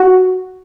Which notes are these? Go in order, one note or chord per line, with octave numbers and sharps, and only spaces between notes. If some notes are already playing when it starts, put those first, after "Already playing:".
Already playing: F#4